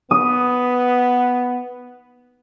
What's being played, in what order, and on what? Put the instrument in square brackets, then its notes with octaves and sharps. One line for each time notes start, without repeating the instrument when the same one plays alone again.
[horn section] B3 [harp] D#6